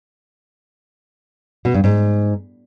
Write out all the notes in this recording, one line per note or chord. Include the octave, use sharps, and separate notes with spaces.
B2
G2
G#2